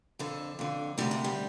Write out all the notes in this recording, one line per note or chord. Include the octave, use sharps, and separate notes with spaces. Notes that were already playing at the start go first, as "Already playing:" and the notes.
F2 D3 A4
F2 D3
D2 C3 G3
A3
G3